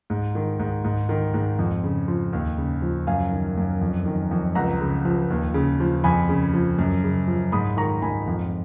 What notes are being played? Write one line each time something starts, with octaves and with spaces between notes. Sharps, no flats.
G#2
D#3
G#2
G#2
D#3
G#2
F2
C#3
F3
D#2
C#3
F3
F#2 F5 G#5
D#3
F#2
F2
D#3
F2
C#2 F#5 A#5
C#3
F3
D#2
C#3
F3
F2 G#5 B5
C#3
F3
F#2
C#3
F3
G#2 B5 D#6
D#3 A#5 C#6
G#2 G#5 B5
F2